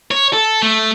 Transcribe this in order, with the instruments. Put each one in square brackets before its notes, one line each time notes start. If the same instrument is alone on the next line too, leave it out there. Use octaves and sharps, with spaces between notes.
[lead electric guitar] C#5
A4
A3